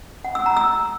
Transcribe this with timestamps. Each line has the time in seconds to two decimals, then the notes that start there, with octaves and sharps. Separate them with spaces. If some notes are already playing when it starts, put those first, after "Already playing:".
0.24 F#5
0.35 E6
0.46 A#5
0.57 E6